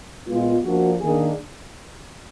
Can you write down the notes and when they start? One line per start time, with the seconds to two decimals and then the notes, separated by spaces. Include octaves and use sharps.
0.26 A#2 G#3 B3 F4
0.63 F3 A#3 D4 F#4
1.00 D#3 A#3 D4 G#4